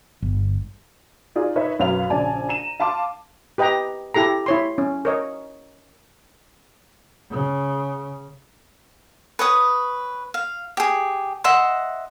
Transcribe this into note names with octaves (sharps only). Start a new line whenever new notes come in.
G1
D#4 F4 G#4 D5
D#4 A#4 B4 C#5 D#5 E5
B1 F#2 B4 C#5 F5 F7
A#1 C#3 D5 G#5 A5
A#5 D#7 E7
F5 A5 C6 D6
G4 B4 D#5 G5 A#5
E4 G4 A4 A#5
E4 C#5 C6
C#4
A#4 C#5 D#5
C#3
B4 C#5 D#6
F5
G4 G#4
D#5 E5 F#5 C6